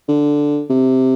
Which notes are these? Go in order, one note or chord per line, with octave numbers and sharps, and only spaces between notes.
D3
C3